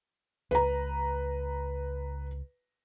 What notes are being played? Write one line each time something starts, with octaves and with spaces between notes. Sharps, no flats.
C#2 B4 A#5